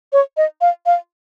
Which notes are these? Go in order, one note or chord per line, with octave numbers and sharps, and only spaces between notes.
C#5
D#5
F5
F5